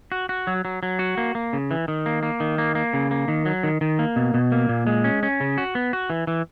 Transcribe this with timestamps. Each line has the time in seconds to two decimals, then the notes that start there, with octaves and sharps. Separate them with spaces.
0.12 F#4
0.29 F#4
0.47 F#3
0.65 F#3
0.83 F#3
0.99 F#4
1.17 A#3
1.35 A#3
1.53 C#3
1.71 E3
1.88 D#3
2.06 A#3
2.23 A#3
2.40 D#3
2.58 A#3
2.75 A#3
2.94 C#3
3.11 A#3
3.28 D#3
3.46 F#3
3.63 D#3
3.81 D#3
3.99 A#3
4.16 B2
4.34 B2
4.52 A#3
4.69 A#2
4.87 G#3
5.04 C#4
5.23 C#4
5.40 C#3
5.58 F#4
5.75 B3
5.93 F#4
6.10 E3
6.27 E3